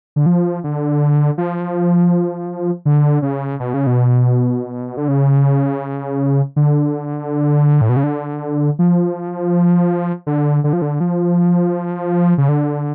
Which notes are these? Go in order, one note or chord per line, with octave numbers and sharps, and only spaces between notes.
D3
F3
D3
F3
D3
C#3
B2
C#3
B2
D3
C#3
D3
A2
B2
C#3
D3
F3
D3
D3
F3
D3
F3
C#3
D3